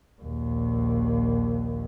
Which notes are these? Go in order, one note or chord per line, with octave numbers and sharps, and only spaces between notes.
A#1 D#2